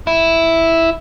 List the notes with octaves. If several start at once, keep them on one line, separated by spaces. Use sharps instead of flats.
E4